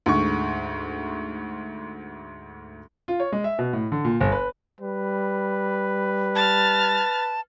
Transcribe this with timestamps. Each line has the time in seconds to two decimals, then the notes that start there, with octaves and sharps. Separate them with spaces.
0.06 D2 G#2 C#6
3.08 F4
3.20 C#5
3.32 G#3
3.44 E5
3.59 B2
3.73 A2
3.92 D3
4.05 A#2
4.20 G1
4.32 B4
4.81 G3 B4
6.35 A5 F6 A6